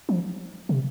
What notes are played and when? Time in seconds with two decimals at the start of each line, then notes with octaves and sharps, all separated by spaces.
0.09 F3
0.69 C3